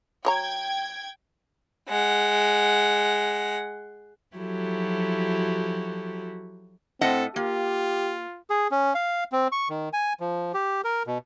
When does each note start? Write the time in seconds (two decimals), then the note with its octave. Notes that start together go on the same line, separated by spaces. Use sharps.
0.25 F#3 C#5 G5 A#5 G#6
1.89 G#3 F#5
4.35 F3 F#3 E4 F#4 G4 A4
7.01 A2 C4 A4 D#5 F#5
7.36 A#3 F4 G4
8.50 G#4
8.71 C#4
8.95 F5
9.32 C4
9.52 C#6
9.70 D#3
9.93 G#5
10.20 F3
10.54 G4
10.84 A#4
11.07 B2